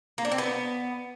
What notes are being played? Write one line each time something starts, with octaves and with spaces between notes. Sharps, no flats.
A#3
D4
C4
B3